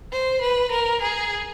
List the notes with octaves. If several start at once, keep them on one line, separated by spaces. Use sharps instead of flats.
C5
B4
A#4
G#4